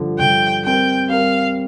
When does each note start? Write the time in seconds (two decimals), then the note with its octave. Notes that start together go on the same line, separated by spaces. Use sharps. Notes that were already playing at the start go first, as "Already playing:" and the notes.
Already playing: G2 D3 F3
0.19 G2 D3 F3 G5
0.64 G3 C4 A#4 G5
1.09 G3 C4 A#4 F5